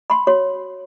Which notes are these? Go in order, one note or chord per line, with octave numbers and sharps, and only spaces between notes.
B5 C6
F#4 C#5 C6